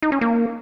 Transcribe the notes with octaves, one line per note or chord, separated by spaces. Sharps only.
D#4
C#4
A#3